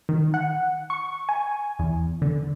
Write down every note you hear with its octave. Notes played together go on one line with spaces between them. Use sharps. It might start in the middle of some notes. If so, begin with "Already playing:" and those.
D#3
F#5
C#6
G#5
E2
D3